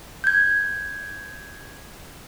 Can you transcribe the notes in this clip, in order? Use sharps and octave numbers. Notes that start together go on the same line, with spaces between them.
G6 G#6